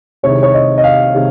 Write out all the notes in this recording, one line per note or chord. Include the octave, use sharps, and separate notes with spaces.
C2 C3 D#3 G#3 C#5
C#5
D#5
D#5
F5
C3 D#3 G#3